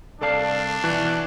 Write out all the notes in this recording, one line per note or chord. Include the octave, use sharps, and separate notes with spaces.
C2 D4 A4 D5 F5 A5
B2 E3 F#4